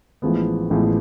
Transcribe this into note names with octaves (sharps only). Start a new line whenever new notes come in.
A1 A2 F3 G#3 B3
A1 A2 F3 G#3 B3